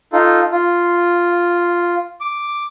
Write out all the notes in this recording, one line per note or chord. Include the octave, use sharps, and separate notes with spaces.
D#4 F4 A4
F4
D6